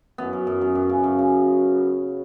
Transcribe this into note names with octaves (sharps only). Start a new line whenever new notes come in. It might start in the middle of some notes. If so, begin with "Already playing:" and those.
F#2 B3
F#2
F#2
F#2
F#2
C#3
F#2
C#3